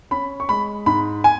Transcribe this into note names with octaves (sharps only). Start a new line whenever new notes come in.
C#4 B5
C#6
G#3 B5
G#2 B5
G#5